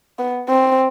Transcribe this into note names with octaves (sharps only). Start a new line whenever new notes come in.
B3
C4